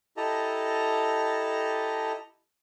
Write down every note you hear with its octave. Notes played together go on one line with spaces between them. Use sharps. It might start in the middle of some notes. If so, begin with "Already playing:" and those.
E4 G4 A4 D#5 A5 A#5